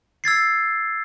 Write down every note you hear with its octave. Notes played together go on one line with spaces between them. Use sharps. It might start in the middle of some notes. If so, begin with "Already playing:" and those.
E6 G#6 A6 C7